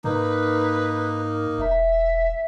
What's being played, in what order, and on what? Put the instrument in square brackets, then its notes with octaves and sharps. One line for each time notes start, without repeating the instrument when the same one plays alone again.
[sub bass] G#2 [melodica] A#3 D#4 [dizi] B4
[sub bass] E1 [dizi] E5